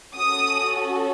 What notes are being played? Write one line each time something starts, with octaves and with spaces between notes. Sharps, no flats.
C#4 F#4 A4 D#6